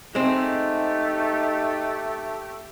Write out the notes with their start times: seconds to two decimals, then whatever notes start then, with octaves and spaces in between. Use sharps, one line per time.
0.15 G#3 A3 C4 D#4 G4